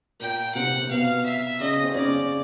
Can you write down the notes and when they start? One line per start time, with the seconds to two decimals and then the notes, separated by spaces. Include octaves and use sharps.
0.20 A#2 A#3 G5
0.55 C3 C4 F#5
0.83 C4
0.90 B2 B3 F5
1.25 E5
1.60 C#3 C#4 D#5
1.84 C4
1.94 C#3 C#4 D5